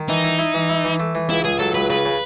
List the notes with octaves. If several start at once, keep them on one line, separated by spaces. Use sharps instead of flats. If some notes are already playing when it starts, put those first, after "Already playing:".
Already playing: D#3
E3 D#4
E4
E4
E3
E4
E3
A3
E3
C#2 E4
C#2 G#4
F#3 A4
C#2 B4
C#3 B4
C#3